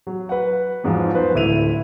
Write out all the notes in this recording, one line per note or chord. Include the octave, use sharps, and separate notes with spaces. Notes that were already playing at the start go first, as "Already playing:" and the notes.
F#3
B4 F#5
E2 G#2 F3 F#3
B4 C5
D1 A3 E4 E5 D#7 F7